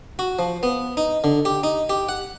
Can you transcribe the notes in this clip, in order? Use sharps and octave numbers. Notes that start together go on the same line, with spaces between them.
F#4
F3
B3
D#4
D3
G4
D#4
G4
F#5